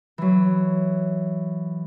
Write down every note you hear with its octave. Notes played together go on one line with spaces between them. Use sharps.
E3 F#3